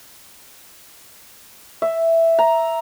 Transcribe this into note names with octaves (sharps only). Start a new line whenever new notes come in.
E5
A#5